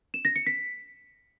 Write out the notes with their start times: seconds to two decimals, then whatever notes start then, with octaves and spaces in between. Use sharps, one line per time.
0.14 E7
0.25 A#6
0.36 C#7
0.47 B6